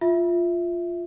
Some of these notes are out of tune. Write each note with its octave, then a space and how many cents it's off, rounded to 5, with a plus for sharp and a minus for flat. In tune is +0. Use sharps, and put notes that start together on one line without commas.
F4 +0 E5 +0